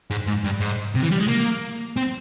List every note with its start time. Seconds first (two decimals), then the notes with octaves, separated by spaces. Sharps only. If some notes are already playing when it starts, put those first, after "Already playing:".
0.10 G#2
0.27 G#2
0.44 G2
0.61 G#2
0.95 C3
1.02 E3
1.11 G3
1.20 G#3
1.28 A#3
1.97 C4